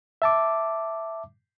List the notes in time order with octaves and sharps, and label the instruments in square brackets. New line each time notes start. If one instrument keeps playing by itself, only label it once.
[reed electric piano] E5 A5 D6